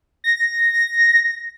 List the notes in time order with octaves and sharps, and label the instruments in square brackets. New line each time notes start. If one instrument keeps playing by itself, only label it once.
[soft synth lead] A#6